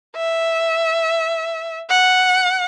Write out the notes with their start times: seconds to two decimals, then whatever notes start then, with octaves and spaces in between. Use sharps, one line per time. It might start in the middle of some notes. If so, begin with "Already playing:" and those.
0.16 E5
1.90 F#5